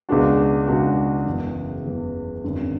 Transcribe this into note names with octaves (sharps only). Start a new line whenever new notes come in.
C#2 B2 G#3 D4 F#4
C#2 B2 G#3 D4 F#4
F#1 E2 C#3 E3
F#1 E2 C#3 E3
G#1 F#2 D3